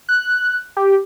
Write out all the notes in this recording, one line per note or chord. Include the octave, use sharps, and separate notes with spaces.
F#6
G4